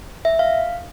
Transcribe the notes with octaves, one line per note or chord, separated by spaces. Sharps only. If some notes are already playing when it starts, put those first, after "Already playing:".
E5
F5